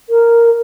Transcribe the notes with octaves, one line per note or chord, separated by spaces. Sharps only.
A#4